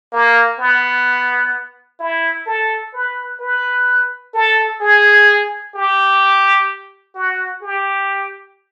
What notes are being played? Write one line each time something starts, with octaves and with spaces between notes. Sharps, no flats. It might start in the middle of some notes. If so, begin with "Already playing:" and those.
A#3
B3
E4
A4
B4
B4
A4
G#4
G4
F#4
G4